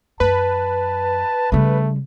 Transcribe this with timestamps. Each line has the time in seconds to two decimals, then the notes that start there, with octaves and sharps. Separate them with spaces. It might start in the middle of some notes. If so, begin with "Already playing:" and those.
0.20 F#2 B4 A5
1.52 C#3 G3 A3